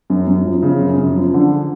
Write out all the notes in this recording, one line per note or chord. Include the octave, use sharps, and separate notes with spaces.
F#2
F#2
F3
C#3
F#2
F#2
F3
D3